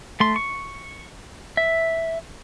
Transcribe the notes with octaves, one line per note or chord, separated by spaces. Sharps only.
A3 C6
C#6
E5